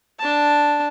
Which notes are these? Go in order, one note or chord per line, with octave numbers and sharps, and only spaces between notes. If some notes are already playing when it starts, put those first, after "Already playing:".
D4 A5